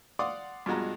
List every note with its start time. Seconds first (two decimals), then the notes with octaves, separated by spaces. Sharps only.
0.19 D5 F5 F#5 C6 D6 D#6
0.66 G2 B2 F3 G#3 F#4 A#5